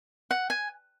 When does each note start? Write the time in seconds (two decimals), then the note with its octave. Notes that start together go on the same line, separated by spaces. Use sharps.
0.31 F#5
0.50 G#5